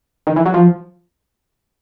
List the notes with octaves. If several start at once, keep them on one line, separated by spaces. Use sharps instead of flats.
D#3
E3
F#3
F3